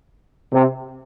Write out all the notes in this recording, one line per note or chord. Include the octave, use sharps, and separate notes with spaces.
C3